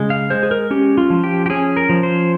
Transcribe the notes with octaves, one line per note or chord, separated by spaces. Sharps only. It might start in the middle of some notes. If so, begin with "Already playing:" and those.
Already playing: C#3 G#3
F5
G#3 C5
G#4
A#4
C#4 G4
F4
F3
G4
G4
C#4 G#4
A#4
F3
C5